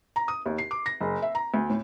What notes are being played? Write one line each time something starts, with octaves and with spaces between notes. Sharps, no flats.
A#5
D#6
D#2
C7
D6
A#6
F#1
E5
A#5
D2
A2